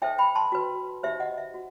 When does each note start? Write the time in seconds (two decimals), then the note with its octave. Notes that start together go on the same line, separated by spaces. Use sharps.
0.02 D#4 A4 C5 E5 G5
0.18 G5 B5
0.35 A5 C6
0.52 F#4 B4
1.03 D#4 G4 C5 E5
1.20 D#5 F#5
1.38 E5
1.54 F#4